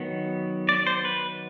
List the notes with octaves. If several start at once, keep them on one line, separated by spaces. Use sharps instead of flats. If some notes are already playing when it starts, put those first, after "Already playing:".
Already playing: D#3 F#3 B3
D5
C5
B4